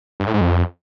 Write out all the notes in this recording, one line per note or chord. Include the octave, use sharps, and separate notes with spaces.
G2
A2
G#2
F2